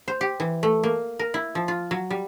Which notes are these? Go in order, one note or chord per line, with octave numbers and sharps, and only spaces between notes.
C5
G4
E3
A3
A#3
A#4
E4
F3
F4
F#3
G3